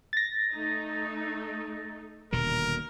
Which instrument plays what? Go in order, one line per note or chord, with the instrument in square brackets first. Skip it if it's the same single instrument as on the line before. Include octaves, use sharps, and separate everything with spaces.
[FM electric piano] A6 A#6
[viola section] A3 D#4
[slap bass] D#1 B2 D3 [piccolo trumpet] A#4